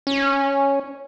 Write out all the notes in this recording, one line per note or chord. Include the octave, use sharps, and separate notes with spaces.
C#4